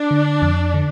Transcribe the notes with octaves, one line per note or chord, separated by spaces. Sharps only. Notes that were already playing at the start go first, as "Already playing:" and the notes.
Already playing: D4
D3
F2
D3